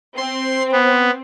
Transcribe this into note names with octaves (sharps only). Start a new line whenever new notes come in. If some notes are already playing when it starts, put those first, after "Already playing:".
C4 C6
B3